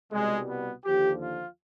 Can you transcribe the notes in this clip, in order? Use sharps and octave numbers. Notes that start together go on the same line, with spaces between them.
C2 B2 G3 G#3
B3
D#2 D3 F3 G4
F4